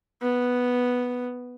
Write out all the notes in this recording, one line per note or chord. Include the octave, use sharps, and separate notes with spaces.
B3